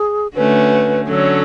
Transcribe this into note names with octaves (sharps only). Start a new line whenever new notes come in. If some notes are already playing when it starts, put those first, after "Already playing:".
Already playing: G#4
D3 A3 C#4 F#4 B4
D3 F#3 C#4 A4